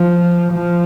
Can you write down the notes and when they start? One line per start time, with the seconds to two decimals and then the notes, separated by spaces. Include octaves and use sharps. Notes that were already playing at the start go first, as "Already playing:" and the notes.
Already playing: F3
0.52 F3